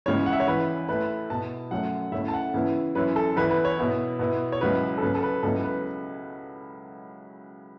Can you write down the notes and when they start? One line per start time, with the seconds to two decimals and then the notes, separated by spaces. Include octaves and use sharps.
0.06 C#2 C#3 E3 C#5
0.26 F#5
0.33 E5
0.40 C#5
0.47 E2 E3 C#4 E4 B4
0.89 A2 A3 E4 B4
1.30 B2 B3 E4 A5
1.71 F#2 F#3 A3 C#4 F#5
2.12 C#3 A3 C#4 E4 E5
2.28 A5
2.33 F#5
2.54 C#3 E3 B3 E4
2.95 F#2 E3 C#4 E4 B4
3.16 A4
3.36 E2 E3 B3 E4 B4
3.51 B4
3.65 C#5
3.79 B2 B3 E4
4.19 B2 B3 E4
4.52 C#5
4.61 C#2 C#3 F#3 C#4 E4 B4
4.98 A4
5.02 C#3 F#3 C#4 B4
5.15 A4
5.23 B4
5.43 C#2 C#3 F#3 B3 E4 A4
5.64 B4